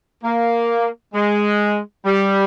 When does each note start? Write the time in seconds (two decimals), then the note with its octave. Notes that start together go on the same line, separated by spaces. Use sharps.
0.24 A#3
1.14 G#3
2.06 G3